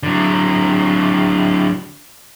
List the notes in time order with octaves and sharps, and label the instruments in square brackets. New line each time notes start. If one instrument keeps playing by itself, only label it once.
[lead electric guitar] D3 F#3